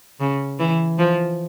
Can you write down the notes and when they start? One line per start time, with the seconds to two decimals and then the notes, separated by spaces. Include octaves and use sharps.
0.20 C#3
0.59 E3
0.98 F3